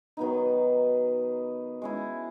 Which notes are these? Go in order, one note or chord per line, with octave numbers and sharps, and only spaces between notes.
D#3 F#3 B3 D#4
G#3 C#4 E4